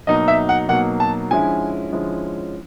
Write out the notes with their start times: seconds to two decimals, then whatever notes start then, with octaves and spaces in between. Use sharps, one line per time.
0.07 B2 F#3 A#3 D#4 D#5
0.28 E5
0.49 F#5
0.68 B2 F#3 A#3 D#4 F#5
1.00 A5
1.31 D3 F3 G#3 C#4 E4 G#5
1.92 D3 F3 G#3 C#4 E4